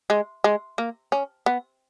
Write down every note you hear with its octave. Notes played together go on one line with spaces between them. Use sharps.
G#3
G#3
A#3
C#4
B3